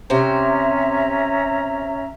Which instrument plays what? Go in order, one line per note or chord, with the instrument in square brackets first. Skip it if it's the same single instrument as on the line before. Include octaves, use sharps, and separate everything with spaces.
[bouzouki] C3 C5 [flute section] C#4 E5 A#5